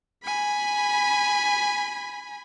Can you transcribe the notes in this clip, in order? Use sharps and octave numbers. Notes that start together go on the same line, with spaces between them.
G#5 B5